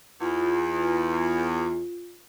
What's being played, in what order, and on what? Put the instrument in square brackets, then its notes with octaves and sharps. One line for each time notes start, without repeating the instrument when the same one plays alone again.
[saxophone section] E2 [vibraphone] F4